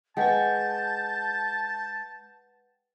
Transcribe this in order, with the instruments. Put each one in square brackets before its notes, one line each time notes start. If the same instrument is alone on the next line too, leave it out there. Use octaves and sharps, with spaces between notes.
[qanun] G#3 C#6 [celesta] B4 F#5 G5 [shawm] A5 [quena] G6